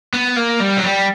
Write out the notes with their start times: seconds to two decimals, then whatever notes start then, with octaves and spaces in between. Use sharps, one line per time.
0.13 B3
0.36 A#3
0.60 G3
0.78 F#3
0.83 G3